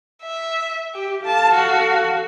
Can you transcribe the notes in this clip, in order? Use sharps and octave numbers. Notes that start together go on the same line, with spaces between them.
E5
G4
A4 F5 A5
F#4